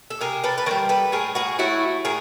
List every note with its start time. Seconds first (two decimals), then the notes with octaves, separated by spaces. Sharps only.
0.10 A4
0.21 C3 G#4 A#4
0.44 A4 B4
0.58 B4
0.66 D#3 G3 A#4 C5
0.89 A4 B4
1.12 A2 G#4 A#4
1.35 F#4 G#4
1.59 F#3 A3 E4 F#4
2.05 A2 G#4 A#4